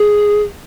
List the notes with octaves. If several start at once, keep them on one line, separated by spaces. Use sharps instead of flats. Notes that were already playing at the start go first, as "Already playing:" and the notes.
Already playing: G#4